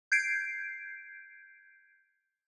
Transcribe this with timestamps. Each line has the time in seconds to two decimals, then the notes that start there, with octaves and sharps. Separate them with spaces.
0.12 G6 G#6 C7 D7